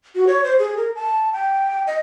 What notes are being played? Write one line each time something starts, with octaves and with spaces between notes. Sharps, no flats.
F#4
C#5
C5
G#4
A#4
A5
G5
D#5